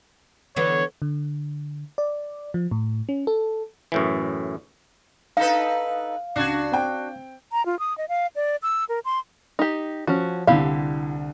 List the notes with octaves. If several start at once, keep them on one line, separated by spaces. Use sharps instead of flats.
D3 E3 B3 C#5
D3
D5
F3
A2
C#4
A4
F#2 A2 E3
D#4 A4 B4 F5
C#2 D4 F#4 G#6
C4 G5
A#5
F4
D#6
D#5
F5
D5
E6
A#4
C6
D#4 G4
F3 C#4 F#4
C2 D3 E4 G4 F5